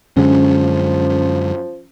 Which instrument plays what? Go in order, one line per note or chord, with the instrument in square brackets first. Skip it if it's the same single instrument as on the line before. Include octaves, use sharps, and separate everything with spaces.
[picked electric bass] F#2 D3 G#3 [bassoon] F3 [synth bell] C#4